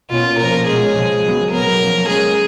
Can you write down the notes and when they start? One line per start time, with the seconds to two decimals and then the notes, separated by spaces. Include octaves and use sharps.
0.10 B2 A#3 C#4 F4
0.38 A#2 F3 A#3 A#4
0.66 B2 G#3 C#4 G#4
0.96 C#3 F3 G#3
1.24 D#3 F#3 B3
1.51 B2 F#3 B3 A#4
1.80 F3 A#3 C#4
2.09 C#3 G#3 C#4 G#4